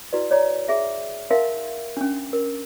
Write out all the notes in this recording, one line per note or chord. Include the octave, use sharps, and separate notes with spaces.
E4 F#4 B4 D5
C#5 D5 A#5
G#4 E5
D#4 A#4 E5 F5 C6
C#4 D4
A#4